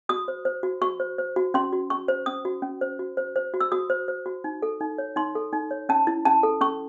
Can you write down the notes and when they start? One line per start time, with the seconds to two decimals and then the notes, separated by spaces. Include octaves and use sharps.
0.09 F#4 D#6
0.28 C5
0.45 C5
0.63 F#4
0.82 F#4 C#6
1.00 C5
1.18 C5
1.36 F#4
1.54 C#4 C6
1.72 F#4
1.90 C#4 C#6
2.08 C5
2.26 C#4 D#6
2.45 F#4
2.62 C#4
2.81 C5
2.99 F#4
3.17 C5
3.36 C5
3.54 F#4
3.60 E6
3.72 F#4 D#6
3.90 C5
4.08 C5
4.26 F#4
4.44 D#4
4.62 A4
4.80 D#4
4.98 C#5
5.16 D#4 C6
5.35 A4
5.53 D#4
5.71 C#5
5.89 C#4 A5
6.07 E4
6.25 C#4 A5
6.43 A4
6.61 C#4 C#6